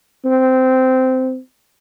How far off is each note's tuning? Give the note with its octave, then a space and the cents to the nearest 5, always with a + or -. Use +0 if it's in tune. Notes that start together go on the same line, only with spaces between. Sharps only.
C4 -15